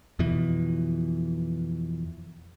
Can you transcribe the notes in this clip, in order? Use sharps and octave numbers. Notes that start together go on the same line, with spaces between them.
F2 B2 E3